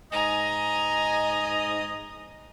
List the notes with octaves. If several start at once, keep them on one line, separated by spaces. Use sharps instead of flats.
G#2 D#5 G#5 A#5